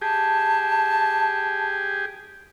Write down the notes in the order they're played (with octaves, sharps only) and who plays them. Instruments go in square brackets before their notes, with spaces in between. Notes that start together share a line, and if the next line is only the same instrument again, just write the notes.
[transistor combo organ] G4 G#4 [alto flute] A5